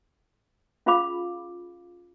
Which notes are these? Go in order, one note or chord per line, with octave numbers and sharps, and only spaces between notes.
C#4 F4 G#4 F5 B5 D6